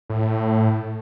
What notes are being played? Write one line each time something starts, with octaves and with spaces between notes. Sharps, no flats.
A2